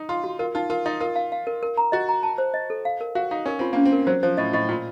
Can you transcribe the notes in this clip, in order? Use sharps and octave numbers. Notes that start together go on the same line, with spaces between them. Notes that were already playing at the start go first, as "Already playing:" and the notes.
Already playing: D#4
F4 C6
F#4
F4 A#4
D#4 F4
F4 A#4
D#4 D#5
F4 A#4
F5
F5
A#4
A#4
A#5
F#4 D#5
A#5
A5
C5
D#5
A4
F5
A#4
F#4 F5
D#4 F5
C#4 A#4
C4 F4
A#3 C#4
C4
A#4
F#3 C5
F3 C5
A2 D#5
A2 D#5
A#2 F4